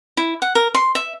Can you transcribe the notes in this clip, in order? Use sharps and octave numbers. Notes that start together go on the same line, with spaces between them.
E4
F#5
A#4
C6
E5